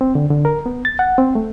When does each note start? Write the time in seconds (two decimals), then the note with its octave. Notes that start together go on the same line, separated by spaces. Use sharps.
0.01 C4
0.15 D3
0.30 D3
0.45 A#4
0.66 B3
0.85 A6
0.99 F#5
1.18 C4
1.35 A3